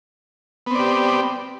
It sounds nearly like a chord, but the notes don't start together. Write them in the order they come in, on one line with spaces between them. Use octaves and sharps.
B3 C4 D5 G4